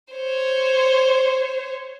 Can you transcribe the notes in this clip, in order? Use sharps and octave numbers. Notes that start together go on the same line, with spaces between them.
C5 C#5